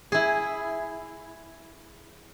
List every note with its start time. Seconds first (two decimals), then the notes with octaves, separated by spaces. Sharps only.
0.12 E4 G#4